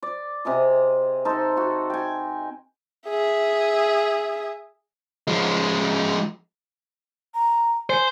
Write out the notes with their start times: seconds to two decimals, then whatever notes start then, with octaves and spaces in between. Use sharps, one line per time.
0.03 D5
0.45 C3 G#4 D#5
1.25 D#4 A4 C5
1.57 F#4 A4
1.90 G5 G#5
3.09 G#4 E5
5.27 F3 G#3
7.34 A#5
7.90 C5 G#5